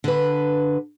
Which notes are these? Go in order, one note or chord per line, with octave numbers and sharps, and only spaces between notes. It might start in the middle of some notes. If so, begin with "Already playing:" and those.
D3 B4